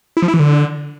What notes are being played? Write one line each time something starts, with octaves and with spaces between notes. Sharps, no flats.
E4
F3
E4
E3
D3